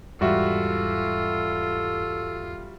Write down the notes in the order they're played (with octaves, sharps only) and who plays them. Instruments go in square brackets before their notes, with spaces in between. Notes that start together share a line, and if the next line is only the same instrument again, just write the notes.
[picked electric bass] E2 G#2 E3 [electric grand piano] G3 F#4 E5 [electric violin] F4 [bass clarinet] A4